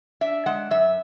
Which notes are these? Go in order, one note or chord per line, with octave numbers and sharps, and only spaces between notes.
D4 E5
G#3 F#5
F#2 E5